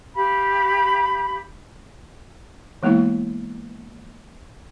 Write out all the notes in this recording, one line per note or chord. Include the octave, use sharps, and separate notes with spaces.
G4 F5 B5
E3 G#3 A#3 B3 E4